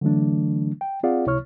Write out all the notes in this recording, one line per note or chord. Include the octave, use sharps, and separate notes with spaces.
D3 E3 F#3 A3 D4
G5
C4 F4 G#4 D5 F5 F#5
C#2 C3 E4 C#5 C#6 F6